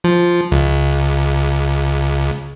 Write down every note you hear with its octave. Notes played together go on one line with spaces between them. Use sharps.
F3
C#2